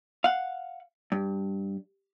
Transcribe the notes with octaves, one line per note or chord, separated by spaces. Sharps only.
F5 F#5
G2